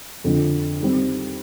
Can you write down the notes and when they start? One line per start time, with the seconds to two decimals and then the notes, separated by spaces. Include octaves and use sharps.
0.24 F2 D3 F3
0.80 D#3 G3 C4